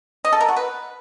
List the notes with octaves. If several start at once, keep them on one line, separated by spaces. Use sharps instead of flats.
D#5
A4
A#4
F#4
B4